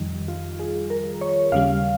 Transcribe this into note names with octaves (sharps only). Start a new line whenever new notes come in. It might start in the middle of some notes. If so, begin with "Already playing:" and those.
Already playing: F2 D#3 G3
F4
G#4
A#4
C#5
D#2 C#3 G3 F5